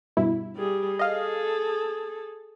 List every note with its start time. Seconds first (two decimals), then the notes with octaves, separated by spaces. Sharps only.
0.17 G2 B2 E4
0.56 G3 G#4
0.99 G#4 A4 D#5 F5